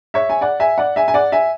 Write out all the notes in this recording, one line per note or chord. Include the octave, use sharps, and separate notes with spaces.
C#5 E5
G#5
D5 F#5
E5 G#5
D5 F#5
E5 G#5
G#5
D5 F#5
E5 G#5